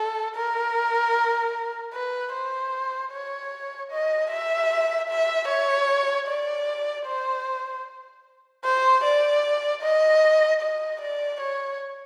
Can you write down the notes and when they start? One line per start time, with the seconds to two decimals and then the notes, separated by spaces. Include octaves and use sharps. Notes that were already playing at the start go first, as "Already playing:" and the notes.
Already playing: A4
0.36 A#4
1.94 B4
2.34 C5
3.12 C#5
3.91 D#5
4.31 E5
5.09 E5
5.49 C#5
6.28 D5
7.07 C5
8.65 C5
9.04 D5
9.83 D#5
10.62 D#5
11.02 D5
11.41 C#5